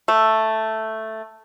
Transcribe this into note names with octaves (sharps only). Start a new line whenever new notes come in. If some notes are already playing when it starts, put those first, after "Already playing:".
A3